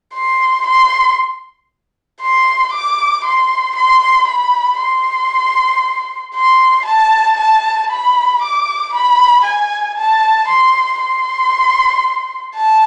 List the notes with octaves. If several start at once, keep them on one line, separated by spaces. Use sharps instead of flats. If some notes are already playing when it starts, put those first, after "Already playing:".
C6
C6
C6
D6
C6
C6
B5
C6
C6
A5
A5
B5
D6
B5
G#5
A5
C6
C6
A5